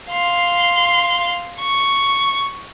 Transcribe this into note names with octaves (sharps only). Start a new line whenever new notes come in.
F5 C6
C#6